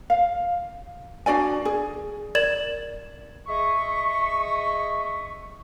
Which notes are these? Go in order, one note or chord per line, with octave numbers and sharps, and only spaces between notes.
F5
D4 F#4 D5 G#5
G#4
A#4 D5 G#6 A6 E7 F#7
G#4 D#5 E5 C#6